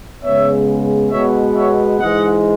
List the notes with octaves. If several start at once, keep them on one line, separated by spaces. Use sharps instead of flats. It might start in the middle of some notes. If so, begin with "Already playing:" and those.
C#3 G#3 B3 C#5 E5
B2 G#3 B3 C#5 E5
C#5 E5
G#2 E3 G#3 D#5 F#5